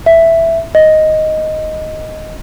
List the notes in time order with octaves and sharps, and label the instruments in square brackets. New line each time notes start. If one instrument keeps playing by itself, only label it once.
[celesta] E5
D#5